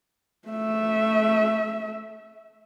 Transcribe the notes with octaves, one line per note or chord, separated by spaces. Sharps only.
A3 E5